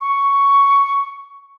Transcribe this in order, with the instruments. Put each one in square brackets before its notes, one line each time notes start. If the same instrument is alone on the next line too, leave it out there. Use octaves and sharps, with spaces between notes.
[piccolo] C#6